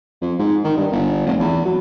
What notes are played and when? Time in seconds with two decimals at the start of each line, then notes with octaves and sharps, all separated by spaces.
0.22 F2
0.39 G#2
0.64 D#3
0.77 G2
0.92 G1
1.26 F1
1.40 E2
1.65 F#3